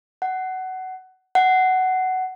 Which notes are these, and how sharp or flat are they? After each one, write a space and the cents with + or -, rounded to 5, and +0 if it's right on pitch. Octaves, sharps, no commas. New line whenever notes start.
F#5 +20
F#5 +15